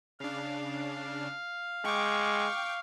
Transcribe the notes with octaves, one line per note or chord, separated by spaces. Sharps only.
C#3 D4 F5
G#3 G5 C#6 D6